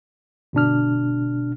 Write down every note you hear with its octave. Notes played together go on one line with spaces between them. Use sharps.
G1 B2 D4 F6